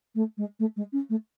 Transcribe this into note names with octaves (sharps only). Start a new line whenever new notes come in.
A3
G#3
A3
G#3
C#4
A3